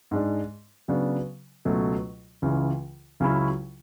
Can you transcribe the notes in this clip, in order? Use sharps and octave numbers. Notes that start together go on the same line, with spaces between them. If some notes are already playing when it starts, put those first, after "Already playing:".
G#2 G#3 D4
C#3 F#3 B3 D4
C#2 B2 F#3 A3 C#4
C#2 C#3 E3
C#2 C#3 F#3 C#4 E4